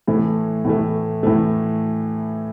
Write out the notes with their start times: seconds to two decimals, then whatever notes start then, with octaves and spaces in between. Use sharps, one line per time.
0.07 A2 E3 A3
0.65 A2 E3 A3
1.23 A2 E3 A3